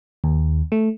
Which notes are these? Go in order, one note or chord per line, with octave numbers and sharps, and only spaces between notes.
D#2
A3